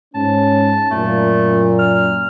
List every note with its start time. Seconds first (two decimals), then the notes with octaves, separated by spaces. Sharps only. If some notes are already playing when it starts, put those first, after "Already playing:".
0.15 G#2 C#4 A5
0.91 F#2 A#2 A3
1.79 F6